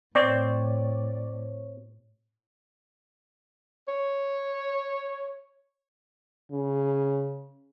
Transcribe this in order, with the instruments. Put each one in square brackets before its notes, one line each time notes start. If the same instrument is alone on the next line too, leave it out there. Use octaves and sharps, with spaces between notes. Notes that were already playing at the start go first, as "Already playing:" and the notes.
[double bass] A2 [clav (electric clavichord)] C4 [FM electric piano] C#5 [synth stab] D5
[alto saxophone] C#5
[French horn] C#3